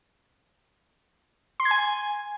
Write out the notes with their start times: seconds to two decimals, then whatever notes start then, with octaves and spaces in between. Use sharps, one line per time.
1.60 C6
1.65 G#6
1.71 G#5